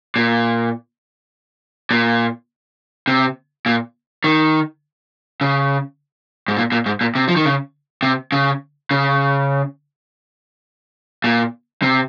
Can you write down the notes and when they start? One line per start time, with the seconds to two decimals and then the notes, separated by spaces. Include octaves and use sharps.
0.16 A#2
1.91 A#2
3.08 C3
3.66 A#2
4.24 D#3
5.41 C#3
6.48 G#2
6.57 A#2
6.72 A#2
6.86 G#2
7.01 A#2
7.15 C3
7.28 F3
7.36 D#3
7.45 C#3
8.03 C3
8.32 C#3
8.91 C#3
11.24 A#2
11.82 C3